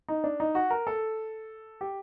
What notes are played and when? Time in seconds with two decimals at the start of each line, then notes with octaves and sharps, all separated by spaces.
0.08 D#4
0.24 D4
0.40 D#4
0.55 F#4
0.71 A#4
0.87 A4
1.81 G4